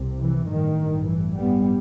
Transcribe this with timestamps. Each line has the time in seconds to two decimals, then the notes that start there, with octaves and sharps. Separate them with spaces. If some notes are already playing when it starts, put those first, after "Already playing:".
Already playing: C2 C3
0.19 E3
0.48 A1 G2 D#3
1.06 E3
1.35 G3 B3